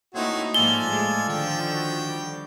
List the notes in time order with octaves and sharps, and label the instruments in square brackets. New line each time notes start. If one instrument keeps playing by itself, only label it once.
[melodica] A3 C4 C#5 [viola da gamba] A#3 D#4 E4 [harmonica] F#4
[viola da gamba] G#2 F3 A#3 [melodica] F4 A4 D5 [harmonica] G#5 [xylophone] G7
[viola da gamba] A2 G#3
[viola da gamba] D3 D#3 F3 [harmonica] G5
[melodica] F#4
G3 D6